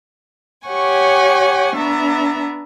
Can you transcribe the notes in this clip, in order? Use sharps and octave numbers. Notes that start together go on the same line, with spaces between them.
G4 C#5 F#5 G#5 C#6
B3 D4 E5 A#5